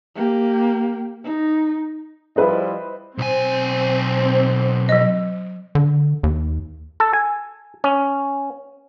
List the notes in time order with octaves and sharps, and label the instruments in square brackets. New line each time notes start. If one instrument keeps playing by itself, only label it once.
[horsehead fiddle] A#3 G4
D#4
[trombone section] F3 G3 E4 [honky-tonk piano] B4 C5 D#5
[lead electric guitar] B1 G#5 [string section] C4
[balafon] F#3 D#5
[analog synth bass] D3
D#2
[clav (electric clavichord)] A4
G#5
C#4